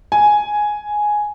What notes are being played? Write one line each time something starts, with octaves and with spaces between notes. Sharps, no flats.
G#5